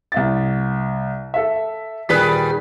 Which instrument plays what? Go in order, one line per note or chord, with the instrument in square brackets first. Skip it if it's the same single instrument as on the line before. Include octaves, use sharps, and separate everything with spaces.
[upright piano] C2 E5 A6
A4 E5
[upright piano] D#1 D#3 B6 [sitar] G3 G#4 B4